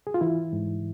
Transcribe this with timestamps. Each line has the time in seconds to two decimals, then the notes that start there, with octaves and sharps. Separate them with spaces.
0.07 G#4
0.14 F4
0.21 E3 E4
0.53 G#2